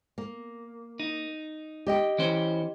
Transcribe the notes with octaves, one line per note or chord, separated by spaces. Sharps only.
A#3
D#4
G4 D#5 G5
E3 C#4 C5